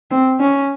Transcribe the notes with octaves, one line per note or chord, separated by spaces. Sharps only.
C4
C#4